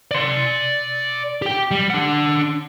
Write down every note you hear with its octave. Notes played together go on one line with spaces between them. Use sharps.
D5 C6
G4 G5
G3
D4 F#5